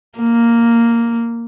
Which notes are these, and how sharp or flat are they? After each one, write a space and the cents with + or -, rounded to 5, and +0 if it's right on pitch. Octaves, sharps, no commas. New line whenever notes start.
A#3 -5